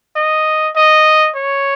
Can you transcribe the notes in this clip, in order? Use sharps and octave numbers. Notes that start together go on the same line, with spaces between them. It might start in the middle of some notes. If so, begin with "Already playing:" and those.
D#5
D#5
C#5